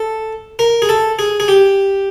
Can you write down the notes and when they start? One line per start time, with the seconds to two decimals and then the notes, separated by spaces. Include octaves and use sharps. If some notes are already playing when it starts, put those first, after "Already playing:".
Already playing: A4
0.59 A#4
0.82 G#4
0.89 A4
1.19 G#4
1.40 G#4
1.48 G4